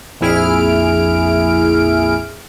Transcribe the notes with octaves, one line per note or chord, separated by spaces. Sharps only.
A#1 F2 E4 G#4 F6 D7